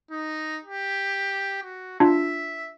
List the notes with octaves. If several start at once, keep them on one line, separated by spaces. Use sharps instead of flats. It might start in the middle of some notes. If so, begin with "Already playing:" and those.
D#4
G4
F#4
D4 F4 E5